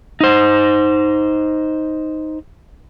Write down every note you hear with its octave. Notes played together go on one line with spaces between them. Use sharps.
D#4 C5